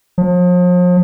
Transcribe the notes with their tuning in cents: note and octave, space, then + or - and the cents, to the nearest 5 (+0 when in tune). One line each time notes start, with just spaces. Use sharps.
F3 +40